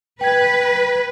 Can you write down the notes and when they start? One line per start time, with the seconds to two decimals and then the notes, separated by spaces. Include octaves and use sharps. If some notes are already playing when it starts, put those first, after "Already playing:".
0.21 B4 G5 G#6